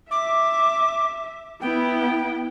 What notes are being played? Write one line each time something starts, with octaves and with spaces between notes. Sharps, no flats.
E5 D6
B3 E4 G5